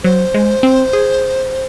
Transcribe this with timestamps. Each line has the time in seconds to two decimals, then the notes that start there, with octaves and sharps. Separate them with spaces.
0.04 F#3 C5
0.34 G#3
0.63 C4
0.93 G#4